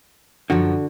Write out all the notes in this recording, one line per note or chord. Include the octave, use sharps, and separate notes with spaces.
F#2 D3 F3 F#4